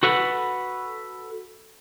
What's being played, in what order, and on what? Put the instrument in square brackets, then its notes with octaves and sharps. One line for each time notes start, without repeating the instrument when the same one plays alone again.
[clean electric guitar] F#4 A4 B4 F#5